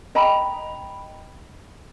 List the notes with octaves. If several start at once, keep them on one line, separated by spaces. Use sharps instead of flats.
D#5 G5 A#5 B5